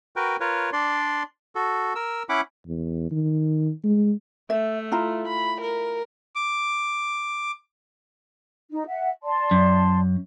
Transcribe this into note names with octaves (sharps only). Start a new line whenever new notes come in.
F#4 A#4 B4 G5
F4 A#4 B4 C#5
D4 D5 C6
F#4 A4
A#4 E6
C#4 E4 F#5 B5 D6
E2
D#3
G#3
A3 E5
E4 F4 A#5
B5
A#4
D6
D#4
E5 F#5
D5 A5 C6
F#2